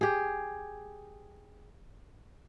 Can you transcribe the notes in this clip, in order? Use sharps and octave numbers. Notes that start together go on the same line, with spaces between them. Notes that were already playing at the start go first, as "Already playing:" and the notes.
G4 G#4